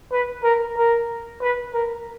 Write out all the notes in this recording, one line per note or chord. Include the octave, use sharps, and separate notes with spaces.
B4
A#4
A#4
B4
A#4